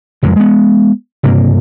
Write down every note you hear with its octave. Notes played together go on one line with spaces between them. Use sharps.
F#1 F2 G#3
G#3 B3
F#1 G2 C3 A#3